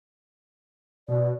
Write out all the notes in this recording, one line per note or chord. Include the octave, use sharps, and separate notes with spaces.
B2 D5